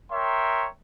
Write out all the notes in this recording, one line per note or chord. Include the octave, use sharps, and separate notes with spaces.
A#4 C#5 E5 G5 A#5 C6